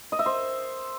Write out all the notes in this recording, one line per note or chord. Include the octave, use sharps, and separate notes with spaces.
D#5
E5
C5